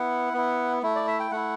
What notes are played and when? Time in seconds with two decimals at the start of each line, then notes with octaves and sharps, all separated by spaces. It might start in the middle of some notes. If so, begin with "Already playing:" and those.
Already playing: B3 E4 F#5
0.33 B3 E4
0.83 A3 E4
0.95 D5
1.07 E5
1.20 G5
1.31 A3 E4 F#5